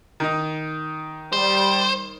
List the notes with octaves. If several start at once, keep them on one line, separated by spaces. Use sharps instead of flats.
D#3 D#4
G3 C5